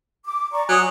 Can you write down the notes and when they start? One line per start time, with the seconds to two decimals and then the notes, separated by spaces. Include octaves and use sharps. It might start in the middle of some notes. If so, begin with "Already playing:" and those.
0.24 D6
0.53 D5 A#5 C#6
0.69 F#3 G#5 D#6